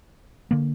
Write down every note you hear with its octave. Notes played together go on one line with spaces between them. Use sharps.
D3 A#3